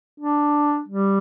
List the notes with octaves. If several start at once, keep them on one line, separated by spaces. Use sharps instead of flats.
D4
G3